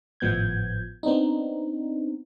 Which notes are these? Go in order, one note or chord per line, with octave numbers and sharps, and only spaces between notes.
G#1 A2 F3 B3 G6 G#6
B3 C4 D4 D#4